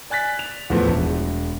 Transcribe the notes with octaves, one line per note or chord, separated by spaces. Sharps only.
D5 G#5 F#6 A6 B6
F7
E2 A2 F3 A3 B3
E1